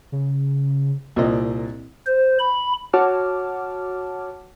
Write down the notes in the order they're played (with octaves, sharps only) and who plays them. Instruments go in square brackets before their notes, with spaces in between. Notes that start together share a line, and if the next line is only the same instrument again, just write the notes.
[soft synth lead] C#3
[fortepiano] C2 A#2 C4 D#5
[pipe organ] C5
B5
[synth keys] F#4 C#5 F#5 A5 D6 F6